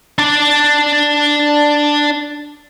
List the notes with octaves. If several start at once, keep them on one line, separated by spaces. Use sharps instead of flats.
D4 D5